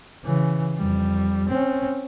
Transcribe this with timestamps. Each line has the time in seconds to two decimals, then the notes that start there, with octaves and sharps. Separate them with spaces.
0.24 C#3 E3
0.77 F2 G3
1.49 C4 C#4